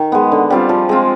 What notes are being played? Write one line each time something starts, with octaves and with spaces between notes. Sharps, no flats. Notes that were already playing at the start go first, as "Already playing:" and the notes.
Already playing: D#3
G#3 B3
D3
G3 C4 F4
F3
G#3 C4 F4